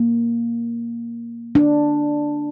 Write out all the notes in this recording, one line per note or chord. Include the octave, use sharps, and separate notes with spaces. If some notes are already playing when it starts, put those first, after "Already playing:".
Already playing: A#3
D4